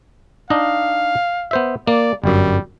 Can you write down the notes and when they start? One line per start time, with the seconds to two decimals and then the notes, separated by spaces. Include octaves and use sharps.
0.50 D4 D#4 D#5 F5
1.51 B3 C5 E5
1.87 A#3 D5
2.24 G1 F#2 G3